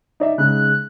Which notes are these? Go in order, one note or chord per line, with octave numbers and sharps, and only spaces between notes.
D#4 D5 E5
C#3 G#3 D#4 F#6